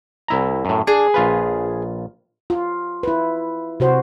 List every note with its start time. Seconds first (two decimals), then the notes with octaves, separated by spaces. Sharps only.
0.28 C2 E4 A#5
0.65 F#2 A2
0.87 D4 G#4
1.14 A#1 F4 B4
2.50 F4
3.03 E4 B4
3.80 C3 F#4 C5